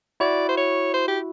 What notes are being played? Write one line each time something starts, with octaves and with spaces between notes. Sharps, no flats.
E4 F#4 D5
C5
C#5
C5
G4